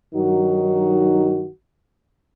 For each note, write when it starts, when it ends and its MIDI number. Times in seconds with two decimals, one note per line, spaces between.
0.15 1.48 43
0.15 1.48 51
0.15 1.48 54
0.15 1.48 63
0.15 1.48 66